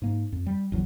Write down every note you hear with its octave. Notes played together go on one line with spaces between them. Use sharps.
G#2 A#3
F2
G3
F#1 E2 F#3